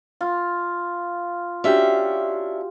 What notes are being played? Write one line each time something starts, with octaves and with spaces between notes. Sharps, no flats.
F4
C#4 D4 F#4 G4 E5